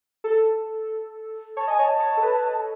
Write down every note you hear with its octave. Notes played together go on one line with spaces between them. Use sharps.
A4
C#5 A5
D#5 G#5
C#5
A5
C#5
A4
B4